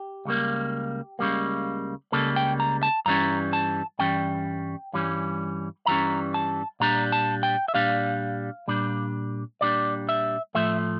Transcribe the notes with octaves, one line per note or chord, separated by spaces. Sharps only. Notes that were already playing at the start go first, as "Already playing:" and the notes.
Already playing: G4
C#2 C#3 G3 A#3
C#2 C#3 G3 A#3
C#2 C#3 G3 A#3 A4
G5
A#5
A5
G2 E3 G3 C#4 A#5
A5
G2 E3 G3 C#4 G5
G2 E3 G3 C#4
G2 E3 G3 C#4 A#5
A5
A#2 G3 D4 A#5
A5
G5
E5
A#2 G3 D4 F5
A#2 G3 D4
A#2 G3 D4 D5
E5
A2 F3 A3 E5